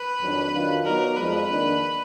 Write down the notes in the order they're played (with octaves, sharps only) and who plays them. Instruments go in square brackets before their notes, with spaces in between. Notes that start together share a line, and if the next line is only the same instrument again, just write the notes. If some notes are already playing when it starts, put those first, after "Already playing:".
Already playing: [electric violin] B4
[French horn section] F2 D#3 F#3 D4
D#3 F#3 D4 F4
[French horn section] F#3 B3 D#4 F#4 D5 [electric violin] A#4
[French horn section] F2 F3 G#3 [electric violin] B4
[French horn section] D#3 A#3 D4